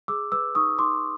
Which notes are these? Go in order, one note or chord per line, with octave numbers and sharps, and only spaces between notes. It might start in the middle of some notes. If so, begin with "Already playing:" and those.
G#4 D6 E6
B4 D6 E6
D#4 C#6 D#6
D#4 C6 D6